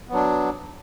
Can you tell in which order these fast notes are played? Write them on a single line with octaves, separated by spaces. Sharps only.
B3 F#3 D4